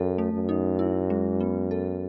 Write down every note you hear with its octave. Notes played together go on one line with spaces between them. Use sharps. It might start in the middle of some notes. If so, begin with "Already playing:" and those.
Already playing: F#2 A4
A3
F#2
D#4
E4
G#3
B3
A4